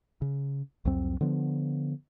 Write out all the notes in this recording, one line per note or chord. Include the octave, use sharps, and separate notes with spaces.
C#3
C2 F2 F#3 C4
D3 F3 B3